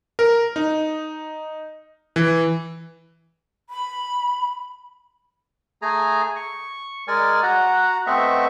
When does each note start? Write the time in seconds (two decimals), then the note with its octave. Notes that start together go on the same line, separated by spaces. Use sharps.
0.19 A#4
0.56 D#4
2.16 E3
3.70 B5
5.82 A3 G#4 G#5 A#5
6.36 C#6
7.08 G#3 A#4 D5 G#5
7.43 F#4 F#5 A#5
8.07 A3 B3 C4 D#5 E5 C#6